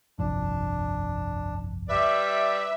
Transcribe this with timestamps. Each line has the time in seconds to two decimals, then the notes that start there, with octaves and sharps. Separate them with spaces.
0.19 G1 C2 F2 D4
1.89 G3 B4 D5 E5